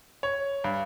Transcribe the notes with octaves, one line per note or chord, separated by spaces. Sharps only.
C#5
G2